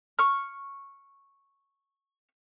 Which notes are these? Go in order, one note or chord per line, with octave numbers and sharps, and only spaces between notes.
C#6 F6